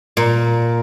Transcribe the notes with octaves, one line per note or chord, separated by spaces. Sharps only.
A#2